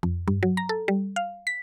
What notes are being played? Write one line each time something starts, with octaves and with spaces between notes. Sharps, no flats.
F2
G2
F#3
A#5
A4
G3
F5
B6